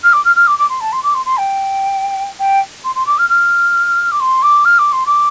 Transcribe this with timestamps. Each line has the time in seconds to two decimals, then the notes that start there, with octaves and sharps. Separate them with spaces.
0.03 F6
0.13 D6
0.25 F6
0.36 F6
0.47 D6
0.59 D6
0.69 C6
0.80 A5
0.92 C6
1.03 D6
1.14 C6
1.26 C6
1.37 G5
2.39 G5
2.84 C6
2.95 C6
3.06 D6
3.18 F6
3.29 F6
4.12 D6
4.20 C6
4.42 D6
4.65 F6
4.78 D6
4.92 C6
5.06 D6